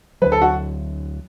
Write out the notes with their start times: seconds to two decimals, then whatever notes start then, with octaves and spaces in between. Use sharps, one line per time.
0.22 D2 D3 F#3 B4
0.32 A4
0.42 F#4